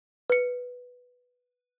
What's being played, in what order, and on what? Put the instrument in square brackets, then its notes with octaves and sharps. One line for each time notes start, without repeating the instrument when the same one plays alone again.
[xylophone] B4 C#7